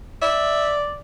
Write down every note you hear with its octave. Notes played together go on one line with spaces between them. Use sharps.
D5 E5